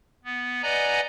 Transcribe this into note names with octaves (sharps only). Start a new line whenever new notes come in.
B3
B4 D5 D#5 F#5 G#5 A#5